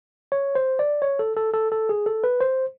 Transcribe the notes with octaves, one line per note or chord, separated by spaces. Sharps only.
C#5
C5
D5
C#5
A4
A4
A4
A4
G#4
A4
B4
C5